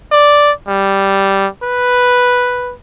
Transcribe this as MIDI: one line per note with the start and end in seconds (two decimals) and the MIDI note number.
0.12 0.51 74
0.68 1.47 55
1.63 2.73 71